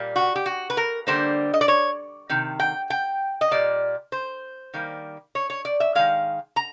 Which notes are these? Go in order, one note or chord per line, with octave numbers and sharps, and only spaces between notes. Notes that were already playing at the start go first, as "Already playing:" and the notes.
Already playing: A#2 G3 A#3
F#4
G4
F#4
B4
A#4
D3 G3 A#3 C5
D#5
D5
C#5
C3 D#3
G5
G5
D#5
A#2 G3 A#3 D5
C5
D#3 G3 A#3
C#5
C#5
D5
E5
D#3 G#3 F5
A#5